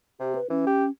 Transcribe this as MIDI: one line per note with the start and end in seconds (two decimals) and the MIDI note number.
0.20 0.38 48
0.20 0.33 67
0.35 0.47 71
0.50 0.62 52
0.50 0.90 61
0.67 0.85 67